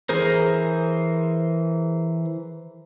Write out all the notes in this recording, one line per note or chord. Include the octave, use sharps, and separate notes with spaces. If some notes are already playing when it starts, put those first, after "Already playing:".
E3 G#4 A#4 C5